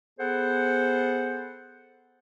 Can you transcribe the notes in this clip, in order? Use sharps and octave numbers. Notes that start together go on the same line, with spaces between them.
B3 G#4 A4 C5 F#5